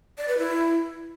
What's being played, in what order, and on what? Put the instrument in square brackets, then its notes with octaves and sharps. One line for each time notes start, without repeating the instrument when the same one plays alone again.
[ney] D5
B4
E4